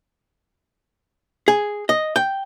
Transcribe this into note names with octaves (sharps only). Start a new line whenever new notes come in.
G#4
D#5
G5